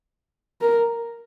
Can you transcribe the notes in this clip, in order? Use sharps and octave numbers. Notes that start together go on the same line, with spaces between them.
A#4